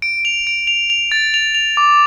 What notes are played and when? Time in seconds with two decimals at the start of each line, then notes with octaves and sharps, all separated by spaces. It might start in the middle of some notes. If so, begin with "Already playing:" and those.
0.02 D7
0.25 F7
0.47 D7
0.67 F7
0.90 F7
1.12 A6
1.34 F7
1.55 F7
1.77 D6